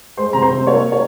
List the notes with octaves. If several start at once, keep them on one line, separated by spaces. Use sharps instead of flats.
G#3 C5 C6
C3 A#5
C5 C6
C3
A#3 C#5 C#6
C#5